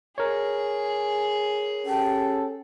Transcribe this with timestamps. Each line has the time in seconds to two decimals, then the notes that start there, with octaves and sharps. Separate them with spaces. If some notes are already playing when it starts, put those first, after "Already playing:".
0.18 G#4 A#4 C#5
1.86 C#4 G4 A4 G5